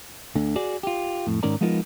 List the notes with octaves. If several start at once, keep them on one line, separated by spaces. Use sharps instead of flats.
D2 D3
F#4 G#4 D5
F4 G4
F2 A2
G#2 D#3 C#4 A#4 D5 A#5
F3 G#3 B3 D#4 F4 A#4